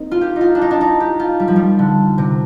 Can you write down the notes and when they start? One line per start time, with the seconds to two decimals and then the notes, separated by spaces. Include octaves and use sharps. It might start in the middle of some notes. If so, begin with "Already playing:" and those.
Already playing: A#3 C4 D#4
0.11 F4
0.21 G4
0.36 D#4
0.41 F4
0.55 D4
0.61 D#4
0.71 D4
0.81 D#4
1.00 G4
1.19 F4
1.40 G3
1.48 F3
1.56 G3
1.79 D3
2.18 C3